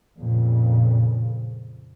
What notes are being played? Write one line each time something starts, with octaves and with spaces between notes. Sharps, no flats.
F2 A#2 C#3